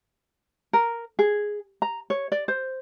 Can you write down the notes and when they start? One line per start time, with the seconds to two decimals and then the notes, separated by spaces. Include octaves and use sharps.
0.73 A#4
1.19 G#4
1.82 A#5
2.10 C#5
2.32 D5
2.48 C5